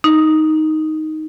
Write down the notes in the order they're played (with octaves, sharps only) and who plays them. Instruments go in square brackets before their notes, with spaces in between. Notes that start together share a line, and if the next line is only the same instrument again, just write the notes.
[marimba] D#4